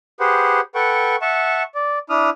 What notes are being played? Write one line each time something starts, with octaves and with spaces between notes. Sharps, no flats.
G4 G#4 B4 C5 F#5
A4 B4 F#5 G5 C#6
E5 F#5 A5 C#6
D5
D4 E4 D#6 F6